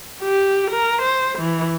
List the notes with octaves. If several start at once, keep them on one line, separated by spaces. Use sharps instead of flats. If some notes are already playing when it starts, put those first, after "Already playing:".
G4
A#4
C5
E3